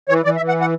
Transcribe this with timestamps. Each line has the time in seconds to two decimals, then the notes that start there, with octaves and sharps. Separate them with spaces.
0.09 E3 C#5
0.25 E3 D5
0.37 E5
0.40 E3
0.48 F#5
0.61 F#5